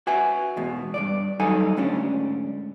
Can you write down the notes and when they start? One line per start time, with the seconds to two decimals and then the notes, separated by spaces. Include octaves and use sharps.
0.07 F#4 B4 E5 F#5 G#5
0.57 E2 G#2 B2
0.94 G2 B2 D5
1.40 D#2 F#3 G3 D#4 A4 G#5
1.77 D2 G#2 C#4 D4